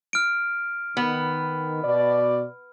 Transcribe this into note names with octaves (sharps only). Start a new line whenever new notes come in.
F6 D7
D#3 B3
B2 D5